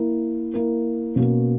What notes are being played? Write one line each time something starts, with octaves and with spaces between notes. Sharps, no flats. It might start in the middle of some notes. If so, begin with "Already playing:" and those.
Already playing: A#3 E4 A#4
A#3 E4 A#4
B2 A#3 C#4 F#4